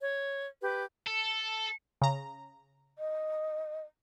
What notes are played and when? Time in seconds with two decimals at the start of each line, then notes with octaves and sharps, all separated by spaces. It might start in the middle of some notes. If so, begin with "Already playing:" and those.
0.01 C#5
0.62 G4 B4
1.07 A4
2.02 C#3 A#5
2.98 D#5